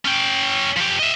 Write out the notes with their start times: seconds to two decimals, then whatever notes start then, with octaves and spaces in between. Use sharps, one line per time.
0.05 C#4 G5
0.77 F3 G4
0.99 D#5 E5